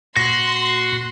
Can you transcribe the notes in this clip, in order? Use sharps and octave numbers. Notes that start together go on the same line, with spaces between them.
A#2 F#4 C6 A#6